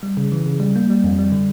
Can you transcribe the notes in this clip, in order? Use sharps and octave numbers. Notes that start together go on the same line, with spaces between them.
G3
C#3
E3
C#3
G3
A#3
G3
F2
G3
D3